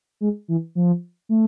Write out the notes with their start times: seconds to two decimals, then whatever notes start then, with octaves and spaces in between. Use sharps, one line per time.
0.21 G#3
0.48 E3
0.75 F3
1.29 A3